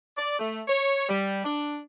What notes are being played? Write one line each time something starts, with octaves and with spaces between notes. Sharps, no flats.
D5
A3
C#5
G3
D4